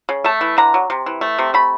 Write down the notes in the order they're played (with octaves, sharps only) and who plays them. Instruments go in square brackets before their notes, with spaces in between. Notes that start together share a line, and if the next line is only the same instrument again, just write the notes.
[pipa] C#3
A3 A5
E3
D3 A#5
F#3
C3
E3
A3
C3
A3 B5